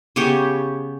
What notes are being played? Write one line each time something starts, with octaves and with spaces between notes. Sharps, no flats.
C#3 B3 G4 C#5